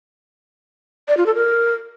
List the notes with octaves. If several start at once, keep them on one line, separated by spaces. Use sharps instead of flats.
D5
F4
A4
A#4